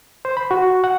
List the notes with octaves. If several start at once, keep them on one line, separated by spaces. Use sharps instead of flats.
C5
B5
F#4
F#5